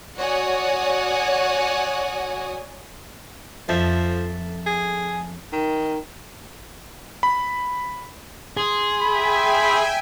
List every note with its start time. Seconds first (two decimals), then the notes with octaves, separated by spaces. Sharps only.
0.18 F#4 C#5 D5 F#5 G#5 D#6
3.68 F2 F3 A4 E5
4.66 G#4
5.52 D#3
7.23 B5
8.57 G#4 C6
9.01 E5 G5 G#5 B5